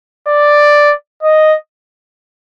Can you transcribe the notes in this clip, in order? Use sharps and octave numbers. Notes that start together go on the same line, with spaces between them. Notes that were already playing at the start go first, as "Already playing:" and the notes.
D5
D#5